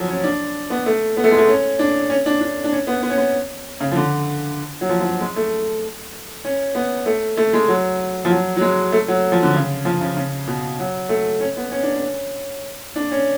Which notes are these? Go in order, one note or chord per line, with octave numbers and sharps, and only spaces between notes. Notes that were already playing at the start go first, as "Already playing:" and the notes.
Already playing: F3 F#3
C#4
D4
B3
A3
B3
A3
G#3
A3
C#4
D4
C#4
D4
D4
D4
C#4
B3
B3
C#4
B3
C#3
F3
D3
F#3
F3
F3
F#3
G#3
A3
C#4
B3
A3
A3
G#3
F#3
F3
F#3
F#3
G#3
A3
F#3
F3
D3
C#3
F3
C#3
C#3
B2
F#3
A3
C#4
B3
C#4
D4
C#4
D4
C#4